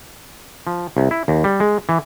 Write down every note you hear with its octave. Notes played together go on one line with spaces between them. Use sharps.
F3
C2
E4
D#2
G3
G#3
E3